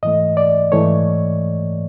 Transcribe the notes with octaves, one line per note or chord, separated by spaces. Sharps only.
G#2 E3 A3 D#5
D5
G#2 E3 A3 C#5